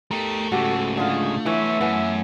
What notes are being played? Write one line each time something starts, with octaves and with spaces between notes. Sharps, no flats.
A3 G4 A#4
G#2 C#3 F#4 G4 A4
D3 F4 G#4
E3 B3 C#5 E5
F#2 E3 B3 C#4